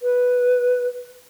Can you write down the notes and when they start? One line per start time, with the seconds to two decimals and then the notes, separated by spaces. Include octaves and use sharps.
0.02 B4